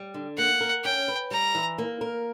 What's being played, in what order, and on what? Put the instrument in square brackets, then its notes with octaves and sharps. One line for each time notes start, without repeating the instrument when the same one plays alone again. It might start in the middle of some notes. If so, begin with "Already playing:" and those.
Already playing: [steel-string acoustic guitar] G3
D3
[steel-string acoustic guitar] A#3 [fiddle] F#5
[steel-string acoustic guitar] A#4
[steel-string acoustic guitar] C#4 [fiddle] G5
[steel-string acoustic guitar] B4
[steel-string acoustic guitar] G3 [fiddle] A#5
[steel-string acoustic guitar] E3
A#3
A#4